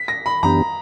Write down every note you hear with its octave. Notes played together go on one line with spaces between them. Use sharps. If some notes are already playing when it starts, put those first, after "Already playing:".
Already playing: B6
A#6
B5
F#2 E3 B3 D4 G4 A#5